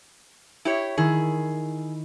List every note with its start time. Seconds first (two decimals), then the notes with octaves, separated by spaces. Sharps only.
0.65 E4 G4 C#5
0.98 D#3 E4 G#4